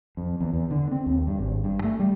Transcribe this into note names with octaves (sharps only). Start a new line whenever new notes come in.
F2
E2
E2
D3
C4
D#2
G2
G#1
G2
A3
G3